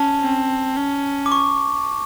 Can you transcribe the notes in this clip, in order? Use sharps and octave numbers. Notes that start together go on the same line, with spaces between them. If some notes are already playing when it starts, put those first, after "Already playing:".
Already playing: C#4 A5
C4
C#4
D6
C#6